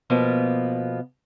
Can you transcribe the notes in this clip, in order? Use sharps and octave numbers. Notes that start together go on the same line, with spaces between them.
B2 F3 A#3 B3